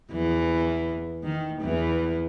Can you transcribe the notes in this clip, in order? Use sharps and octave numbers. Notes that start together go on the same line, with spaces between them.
E2 E3
D#3
E2 E3